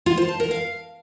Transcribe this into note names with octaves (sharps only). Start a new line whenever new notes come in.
F4
C5
A5
A#4
F5